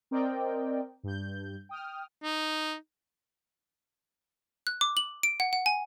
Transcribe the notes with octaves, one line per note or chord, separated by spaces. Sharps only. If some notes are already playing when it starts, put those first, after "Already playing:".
C4 A#4 D5 D#5 G5
G2 G6
G5 D#6 F6
D#4
F#6
D6
F#7
D7
F#5
F#5
G#5